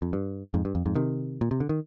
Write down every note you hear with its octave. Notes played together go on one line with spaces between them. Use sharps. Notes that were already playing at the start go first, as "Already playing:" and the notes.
F2
G2
F2 G#2
G2
F2
F2 G#2
C3 D#3
A#2
C3
D3
D#3